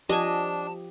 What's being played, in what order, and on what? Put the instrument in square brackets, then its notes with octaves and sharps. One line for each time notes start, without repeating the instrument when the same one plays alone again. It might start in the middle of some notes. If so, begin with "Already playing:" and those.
[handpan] F3 G4 [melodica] D4 [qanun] D#5 G#5 [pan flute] A5